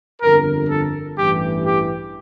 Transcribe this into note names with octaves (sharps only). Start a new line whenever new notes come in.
G1 F2 D3 A#4
A4
A1 G2 E3 G4
G4